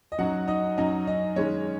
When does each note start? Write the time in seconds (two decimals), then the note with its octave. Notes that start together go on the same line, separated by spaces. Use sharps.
0.12 D#5
0.18 F#2 F#3 D#4 F#4 F#5
0.47 D#4 D#5
0.77 F#2 F#3 D#4 D#5
1.07 D#4 D#5
1.36 F#2 D#3 G#3 C#4 C#5